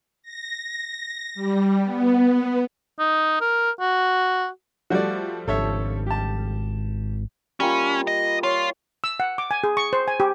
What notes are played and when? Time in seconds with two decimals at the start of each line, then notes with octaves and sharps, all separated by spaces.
0.23 A#6
1.35 G3
1.84 B3
2.99 D#4
3.41 A#4
3.80 F#4
4.90 F3 G3 A3 F#4 D5
5.48 G#1 D4 A4 C#5 E5
6.07 G4 A5
7.60 G3 A#3 C#4 F4
8.07 D#5
8.43 F4 C#5
9.04 E6
9.20 F#5
9.38 D6
9.51 G#5
9.64 G#4
9.77 C#6
9.93 C5
10.08 G#5
10.20 G4